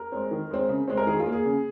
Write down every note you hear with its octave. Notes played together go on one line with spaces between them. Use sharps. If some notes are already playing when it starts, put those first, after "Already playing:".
Already playing: A#4
G#3 C4
D#3
G#3 C4
C#3
G#3 C4
A#4
D#3 G#4
F4
A#3
G#4
C#3